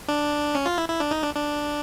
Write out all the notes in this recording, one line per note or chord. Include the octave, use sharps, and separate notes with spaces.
D4
C#4
F4
E4
E4
D4
D#4
D4
D4